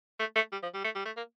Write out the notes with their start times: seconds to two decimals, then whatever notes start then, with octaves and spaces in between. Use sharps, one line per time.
0.19 A3
0.36 A3
0.52 G3
0.63 F3
0.74 G3
0.84 A3
0.95 G3
1.05 A3
1.16 A#3